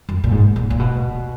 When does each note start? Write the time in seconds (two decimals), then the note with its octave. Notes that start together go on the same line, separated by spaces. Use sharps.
0.09 F#2
0.24 A#2
0.31 G#2
0.56 A#2
0.70 A#2
0.80 B2